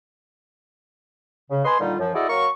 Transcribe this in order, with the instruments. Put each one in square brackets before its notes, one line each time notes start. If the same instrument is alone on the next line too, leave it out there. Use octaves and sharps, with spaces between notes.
[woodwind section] C#3
B4 D#5 G#5 C6
A#2 D3 D#3 G3 D#4 F4
F#2 F3
E4 F#4 G#4 A4 D5 D#5
F#3 A#3 A#4 C#6